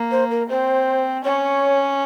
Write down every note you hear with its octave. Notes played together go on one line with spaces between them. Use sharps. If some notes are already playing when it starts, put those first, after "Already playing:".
Already playing: A#3
C5
A#4
C4 C5
C#4 C#5